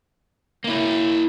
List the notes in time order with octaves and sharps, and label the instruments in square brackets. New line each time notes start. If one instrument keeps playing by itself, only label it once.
[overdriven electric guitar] A#3 E4